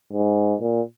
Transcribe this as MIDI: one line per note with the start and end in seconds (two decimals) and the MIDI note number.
0.13 0.55 44
0.61 0.81 46